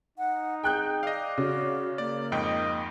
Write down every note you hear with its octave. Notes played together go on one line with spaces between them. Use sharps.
D#4 F#5
G#4 G5 F#6 G6
D5 D#5 F5
C#3 F#4
A#3 D5
F2 G#2 D#5 G5